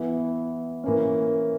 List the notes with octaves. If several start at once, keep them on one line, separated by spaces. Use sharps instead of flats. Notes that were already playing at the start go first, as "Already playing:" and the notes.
Already playing: E3 B3 E4
E3 A#3 C#4